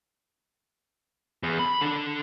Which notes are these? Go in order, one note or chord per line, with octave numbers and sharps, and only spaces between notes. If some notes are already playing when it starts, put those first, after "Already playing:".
E2
B5
D3 D4